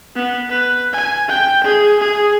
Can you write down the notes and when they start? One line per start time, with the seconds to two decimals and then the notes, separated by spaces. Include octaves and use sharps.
0.16 B3
0.49 B4
0.93 G#5
1.28 G5
1.64 G#4
2.00 G#4